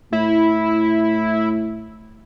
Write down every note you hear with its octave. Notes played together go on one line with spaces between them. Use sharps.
A2 E4